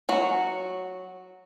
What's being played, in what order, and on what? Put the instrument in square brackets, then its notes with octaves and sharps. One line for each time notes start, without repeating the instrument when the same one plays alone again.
[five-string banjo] F#3 F#4